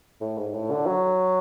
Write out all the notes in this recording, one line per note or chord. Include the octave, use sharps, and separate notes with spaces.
A2
G#2
A2
D3
F#3